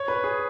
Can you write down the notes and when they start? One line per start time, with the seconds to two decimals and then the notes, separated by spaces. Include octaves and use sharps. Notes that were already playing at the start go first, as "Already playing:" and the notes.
Already playing: C#5
0.08 B4
0.24 G#4